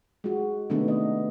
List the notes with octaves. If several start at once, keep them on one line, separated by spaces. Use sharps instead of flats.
G#3 F#4
C3 D#3 A3 B3 D4
D#5